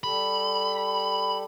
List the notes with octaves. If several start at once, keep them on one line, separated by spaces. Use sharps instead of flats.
G3 G4 A4 B5